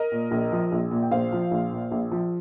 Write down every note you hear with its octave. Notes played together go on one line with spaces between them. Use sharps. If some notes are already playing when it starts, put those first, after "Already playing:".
Already playing: A#4 D#5
A#2
A#1
F3
A#1
A#2
G5
A#1 C5 F5
F3
A#1
A#2
A#1
F3